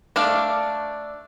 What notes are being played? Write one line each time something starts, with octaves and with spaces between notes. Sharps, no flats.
A3 D4 D5 F5